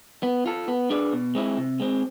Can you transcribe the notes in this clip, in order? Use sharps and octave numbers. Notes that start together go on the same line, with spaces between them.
B3
F4 A4
B3
D4 G#4 B4 D5
B2
G#3 C4 E4
C3
G#3 C4